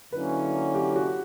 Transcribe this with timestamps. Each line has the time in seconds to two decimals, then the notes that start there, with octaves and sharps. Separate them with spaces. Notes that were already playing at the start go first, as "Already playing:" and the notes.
0.12 D3 F#3 A#3 C#4 E4 B4
0.75 G4
0.96 F#4